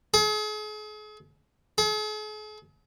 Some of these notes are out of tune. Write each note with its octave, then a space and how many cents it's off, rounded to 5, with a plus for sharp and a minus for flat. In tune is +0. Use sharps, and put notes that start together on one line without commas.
G#4 +40
G#4 +45